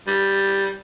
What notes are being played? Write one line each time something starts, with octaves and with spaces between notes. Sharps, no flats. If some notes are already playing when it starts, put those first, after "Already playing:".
G3